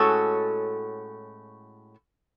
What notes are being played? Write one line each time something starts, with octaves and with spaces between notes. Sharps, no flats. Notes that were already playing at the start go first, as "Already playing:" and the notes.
Already playing: A2 G#3 C#4 F#4 A4